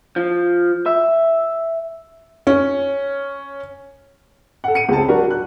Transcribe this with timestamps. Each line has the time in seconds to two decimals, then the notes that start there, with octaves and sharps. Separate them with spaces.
0.16 F3
0.86 E5
2.47 C#4
4.64 A4 F#5
4.75 C#7 D#7
4.89 C#2 G#3 C4 A5
5.08 F#3 D4 F#4 A#4
5.30 F#6